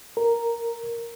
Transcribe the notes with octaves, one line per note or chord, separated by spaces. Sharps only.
A#4